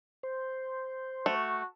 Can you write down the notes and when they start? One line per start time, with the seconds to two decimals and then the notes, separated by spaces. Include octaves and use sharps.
0.23 C5
1.26 A3 F#4